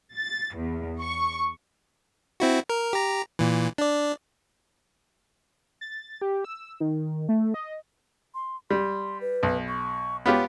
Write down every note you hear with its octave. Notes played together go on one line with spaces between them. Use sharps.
A6
E2
C#6
C4 E4 F#4
A#4
G4 A#5
A#2 E3
D4 D5
A6
G4
E6
D#3
A3
D#5
C6
G3 C6
B4
B1
C#6
B3 F4 G4 C#5